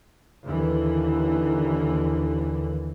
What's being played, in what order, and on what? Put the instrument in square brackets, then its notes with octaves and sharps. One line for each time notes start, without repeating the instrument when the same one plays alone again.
[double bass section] D#2 D3 E3